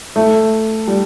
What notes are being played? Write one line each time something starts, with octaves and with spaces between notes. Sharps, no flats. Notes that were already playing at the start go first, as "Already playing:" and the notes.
A3
G3